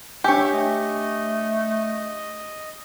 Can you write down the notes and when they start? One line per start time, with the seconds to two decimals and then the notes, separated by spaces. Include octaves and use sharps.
0.24 D4 G4 C#5 E5 G#5
0.52 A3 D#5